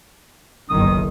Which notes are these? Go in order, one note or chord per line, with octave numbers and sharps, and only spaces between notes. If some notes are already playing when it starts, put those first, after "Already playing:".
F#1 B1 D#3 D#6